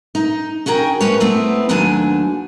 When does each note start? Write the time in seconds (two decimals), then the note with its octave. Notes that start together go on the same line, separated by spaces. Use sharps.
0.15 D#4
0.66 C#4 F#4 G#4 A#4 G5
1.00 A3 A#3 C#4 B4 C#5
1.20 A3 B3 C4 E4
1.69 D#2 F#3 A3 D4 G#5